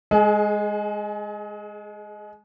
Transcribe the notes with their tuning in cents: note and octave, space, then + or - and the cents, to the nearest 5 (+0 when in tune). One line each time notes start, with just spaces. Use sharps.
G#3 +0 G#4 +35